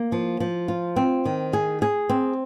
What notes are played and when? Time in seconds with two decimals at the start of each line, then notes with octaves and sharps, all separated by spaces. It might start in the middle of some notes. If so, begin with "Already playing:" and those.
Already playing: A#3
0.12 F3
0.40 F3
0.68 F4
0.96 C4
1.25 D#3
1.53 G#4
1.82 G#4
2.09 C4